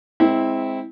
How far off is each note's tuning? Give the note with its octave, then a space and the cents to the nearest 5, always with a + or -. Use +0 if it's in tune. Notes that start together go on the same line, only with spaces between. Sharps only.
G#3 +0 C4 +5 E4 -20